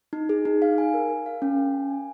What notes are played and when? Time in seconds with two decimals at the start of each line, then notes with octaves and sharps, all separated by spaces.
0.13 D#4
0.29 G#4
0.45 D#4
0.62 F5
0.78 G#5
0.94 A#4
1.10 A#4
1.26 F5
1.42 C#4
1.59 C#4
1.75 G#5
1.90 G#5